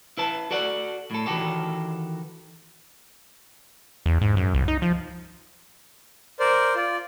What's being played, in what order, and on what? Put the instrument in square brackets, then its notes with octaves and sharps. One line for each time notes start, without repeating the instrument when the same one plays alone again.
[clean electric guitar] E4 B4 A5
F#4 A4 D5 F#5
A2 A4
D#3 E3 A3 F#4 G4 A4
[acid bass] E2
G#2
F#2
C2
D#4
F3
[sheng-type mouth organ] A#4 C5 D5
F4 D5